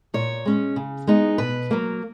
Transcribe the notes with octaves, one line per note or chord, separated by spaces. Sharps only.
A#2 C#5
G#3 C#4
C#3
G#3 B3 D#4
B2 B4
F#3 A#3